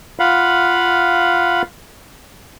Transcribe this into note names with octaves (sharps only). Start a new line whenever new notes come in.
F4 F5 F#5 B5